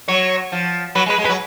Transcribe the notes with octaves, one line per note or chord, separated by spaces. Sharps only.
F#3 C#5
F3
F#3 B4
G#3
B4
G#3
B4
F#3